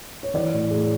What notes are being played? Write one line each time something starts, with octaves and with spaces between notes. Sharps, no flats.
C#5
E3 D5
A2
A2 G#4